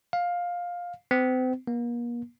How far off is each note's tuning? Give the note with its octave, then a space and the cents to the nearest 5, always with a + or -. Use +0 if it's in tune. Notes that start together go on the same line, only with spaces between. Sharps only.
F5 +15
C4 -40
A#3 +40